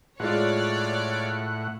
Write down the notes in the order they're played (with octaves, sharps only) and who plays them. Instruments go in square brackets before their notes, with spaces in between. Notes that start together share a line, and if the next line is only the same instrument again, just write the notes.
[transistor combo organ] A2 F#5 [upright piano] G#3 F4 [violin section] C#5 D5